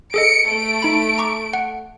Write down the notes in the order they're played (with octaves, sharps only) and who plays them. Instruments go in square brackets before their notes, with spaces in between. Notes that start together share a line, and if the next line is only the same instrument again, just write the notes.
[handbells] G#4 A4 D#5 [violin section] C#7 D7
[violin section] A3 D7
[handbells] D#4 B5
A#5 C#6 D6
F#5